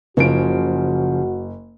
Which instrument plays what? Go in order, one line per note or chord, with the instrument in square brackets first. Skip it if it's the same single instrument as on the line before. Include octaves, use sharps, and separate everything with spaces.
[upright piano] F#1 D7 [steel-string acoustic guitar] C#3 F3 [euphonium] F#4